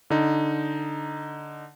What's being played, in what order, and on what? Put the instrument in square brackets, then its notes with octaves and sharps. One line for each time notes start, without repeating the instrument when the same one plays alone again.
[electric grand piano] D3 D#4